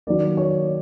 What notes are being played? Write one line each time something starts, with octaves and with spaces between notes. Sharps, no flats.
D#3 F#3 A#3 D5
C#5